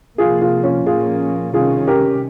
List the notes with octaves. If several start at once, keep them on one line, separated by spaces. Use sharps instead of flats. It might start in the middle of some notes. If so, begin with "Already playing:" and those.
C3 F3 A#3 F4 G#4
F4 G#4
C#4 F4
A#2 F3 A#3 C#4 F4 G#4
C3 D#3 G3 C#4 F4 G#4
G4 A#4